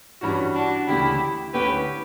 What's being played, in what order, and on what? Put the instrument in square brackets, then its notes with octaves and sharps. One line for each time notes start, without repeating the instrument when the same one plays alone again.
[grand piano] G2 E3 G3 C#4 F#4
[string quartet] D4 F#4
[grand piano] D2 C#3 E3 A3 [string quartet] E4 G4
[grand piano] D2 D3 A3 C#4 E4 [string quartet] G4 B4